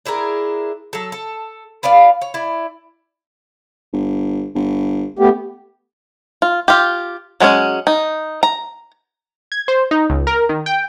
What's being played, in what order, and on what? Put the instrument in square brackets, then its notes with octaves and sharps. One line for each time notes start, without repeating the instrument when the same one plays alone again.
[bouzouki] D4 E4 G#4 A#4
F#3 A4
A4
B3 F4 D5 F5
C#5
E4 D5
[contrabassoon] G1
G1
[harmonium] A3 B3 G4
[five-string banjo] F4
F4 G4
F#3 G#3 C4 C#4
D#4
A#5
[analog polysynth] G#6
C5
D#4
C#2
A#4
D#3
G5